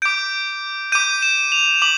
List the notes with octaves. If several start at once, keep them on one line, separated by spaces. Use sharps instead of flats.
D6 G6 D7
D6 G6 D#7
E7
F7
D6 F#7